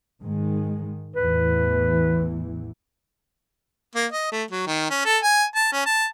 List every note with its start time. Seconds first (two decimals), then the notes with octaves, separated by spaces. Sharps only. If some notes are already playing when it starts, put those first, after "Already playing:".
0.22 G#2 D#3 G#3
1.16 A1 E2 E3 B4
3.95 A#3
4.12 D#5
4.32 A3
4.51 F#3
4.67 D#3
4.90 C#4
5.05 A4
5.23 G#5
5.56 A5
5.73 C#4
5.86 A5